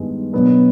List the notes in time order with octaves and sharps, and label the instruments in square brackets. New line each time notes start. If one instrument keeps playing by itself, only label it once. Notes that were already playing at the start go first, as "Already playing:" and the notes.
Already playing: [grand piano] G2 D#3 G#3 B3
B2 F#3 B3 D4